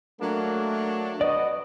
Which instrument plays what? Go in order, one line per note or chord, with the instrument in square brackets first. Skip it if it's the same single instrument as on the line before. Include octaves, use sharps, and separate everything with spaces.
[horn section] F#3 D4 [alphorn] A3 [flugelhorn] A#3
[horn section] F#4 [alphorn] B4 [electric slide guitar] D5 [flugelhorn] D#5